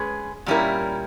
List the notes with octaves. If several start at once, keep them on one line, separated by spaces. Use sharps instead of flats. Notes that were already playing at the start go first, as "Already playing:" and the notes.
Already playing: G#3 C#4 G#4 B4
A#2 G3 C#4 E4 A#4